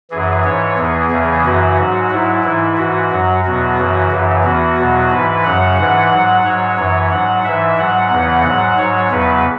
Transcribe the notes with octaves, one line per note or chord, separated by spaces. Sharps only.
F#2 E3 G#4
G#2 E3 C#5
E2 E3 G#4
E2 C#3 E3
F#2 C#3 E3 F#4
G#2 F#3
G#2 F#3 E4
G#2 E3 E4
G#2 E3 F#4
F#2 F#3
E2 B2 F#3 F#4
F#2 C#3 E3
F#2 C#3 E3
E2 E3 F#4
E2 B2 F#3
G#2 E3 B4
F#2 C#3 F#3 F#5
G#2 E3 F#5
G#2 F#3
G#2 F#3 C#5
F#2 E3 C#5
G#2 F#3 F#5
G#2 E3 E5
G#2 F#3 F#5
E2 C#3 E3
G#2 F#3 F#5
G#2 F#3 C#5
E2 C#3 F#3 B4